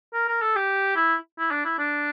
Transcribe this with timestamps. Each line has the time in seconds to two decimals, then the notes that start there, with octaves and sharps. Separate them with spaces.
0.14 A#4
0.28 A#4
0.42 A4
0.56 G4
0.96 E4
1.38 E4
1.51 D4
1.65 E4
1.78 D4